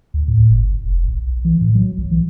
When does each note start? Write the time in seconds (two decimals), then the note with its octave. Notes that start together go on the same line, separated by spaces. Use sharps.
0.14 D2
0.28 A2
0.50 G1
0.85 F1
1.08 B1
1.45 E3
1.61 A2
1.75 F#3
1.98 B1
2.11 E3